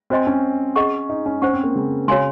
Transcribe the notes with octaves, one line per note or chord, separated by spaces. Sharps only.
C4 F#4 C5 D#5 G#5 C6
C#4
G#4 D#5 F#5 C#6
D#4
C#4
C#4 C5 F#5 C#6
C4
A#3
C#3
C#3 F#4 C#5 F5 G#5 C6